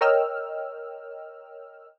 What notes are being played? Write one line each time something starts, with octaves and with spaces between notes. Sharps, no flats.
A#4 C#5 D#5 G5 E6 F6